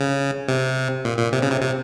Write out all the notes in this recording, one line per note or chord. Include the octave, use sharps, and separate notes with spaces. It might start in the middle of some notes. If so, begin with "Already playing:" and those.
Already playing: C#3
C3
A#2
A#2
C3
C#3
C3
C3